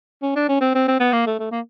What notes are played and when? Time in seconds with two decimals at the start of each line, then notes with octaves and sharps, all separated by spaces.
0.22 C#4
0.36 D4
0.49 C#4
0.61 C4
0.75 C4
0.88 C4
1.00 B3
1.13 A#3
1.27 A3
1.39 A3
1.51 A#3